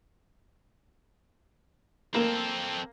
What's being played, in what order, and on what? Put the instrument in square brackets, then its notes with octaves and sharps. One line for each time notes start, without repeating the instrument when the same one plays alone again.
[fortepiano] A#3 [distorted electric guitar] C4 A4